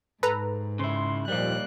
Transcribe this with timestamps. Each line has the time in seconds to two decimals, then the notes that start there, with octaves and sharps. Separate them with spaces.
0.23 G#2 A4 B4 A#5
0.79 C#3 E4 C6
1.28 D#2 A#2 F3 G3 A#3 F#6